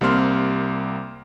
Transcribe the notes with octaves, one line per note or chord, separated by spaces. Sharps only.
C2 G3 A#3 C4 C6 F6